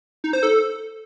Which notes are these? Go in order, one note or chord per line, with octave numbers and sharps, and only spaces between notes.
D#4
C5
A4